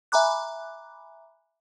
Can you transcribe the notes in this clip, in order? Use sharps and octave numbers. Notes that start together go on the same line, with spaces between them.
E5 G#5 A#5 B5 D6 F#6